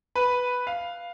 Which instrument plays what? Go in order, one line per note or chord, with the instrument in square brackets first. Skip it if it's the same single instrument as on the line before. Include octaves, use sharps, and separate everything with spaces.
[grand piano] B4
F5